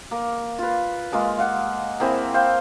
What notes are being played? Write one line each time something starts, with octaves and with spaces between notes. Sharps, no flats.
A#3
F4 B4
G#3 A#3 F4
F5 F#5
A#3 C4 E4 G#4
C5 F5 G5